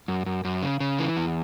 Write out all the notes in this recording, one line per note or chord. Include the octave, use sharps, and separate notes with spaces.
F#2
F#2
F#2
C#3
C#3
E3
E2